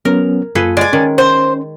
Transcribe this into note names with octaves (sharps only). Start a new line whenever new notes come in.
F#3 B3 C#4 A#4
F#2 A#3 F4 G#4 A4 B4
G#3 D5 G#5
D#3 C#4
C5